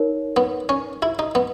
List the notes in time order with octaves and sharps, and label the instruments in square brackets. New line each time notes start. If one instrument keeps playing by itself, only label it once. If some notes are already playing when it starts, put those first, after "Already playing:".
Already playing: [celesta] D#4 A#4 C#5
[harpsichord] B3
C#4
E4
D#4
B3